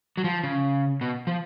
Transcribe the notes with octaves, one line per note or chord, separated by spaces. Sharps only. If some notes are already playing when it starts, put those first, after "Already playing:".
F#3
F3
C#3
B2
F3